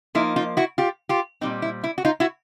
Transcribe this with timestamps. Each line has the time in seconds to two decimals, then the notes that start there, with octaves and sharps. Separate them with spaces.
0.15 F3 A#3 D#4 E4
0.36 D#4 F4
0.57 E4 F#4
0.78 F4 G4
1.09 F4 G4
1.41 A#2 G3 C4 D#4
1.62 E4
1.84 E4
1.98 F#4
2.05 D#4 F4
2.20 E4 F#4